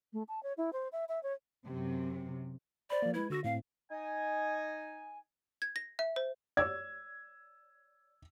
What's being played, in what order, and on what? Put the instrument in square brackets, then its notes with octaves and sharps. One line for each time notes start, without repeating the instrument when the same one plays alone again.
[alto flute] A3
A5
C#5
E4
C5
E5
E5
C#5
[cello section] F#2 C3
[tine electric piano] C5 B5 [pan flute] D5
[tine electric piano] F3 A#3
[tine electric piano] G#3 B4 G#6 [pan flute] E4
[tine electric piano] D3 E6 A#6 [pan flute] F#4
[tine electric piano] A2 C4 [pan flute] F5
[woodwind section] D#4 D#5 G#5
[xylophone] G#6
A#6
E5
C5
[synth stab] C#5 D5 [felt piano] E6 G#6